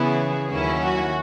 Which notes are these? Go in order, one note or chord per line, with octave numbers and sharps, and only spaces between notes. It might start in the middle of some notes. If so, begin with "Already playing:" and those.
Already playing: C#3 E3 B3 E4 G#4
D#2 D#3 F#3 C#4 E4
F#4